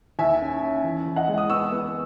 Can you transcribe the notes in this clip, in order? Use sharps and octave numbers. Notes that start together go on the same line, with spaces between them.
D#2 E5 G#5
C#4
C#4
E2
E2
D#5 F#5
G#3
D#6
B3 C#6 E6
B3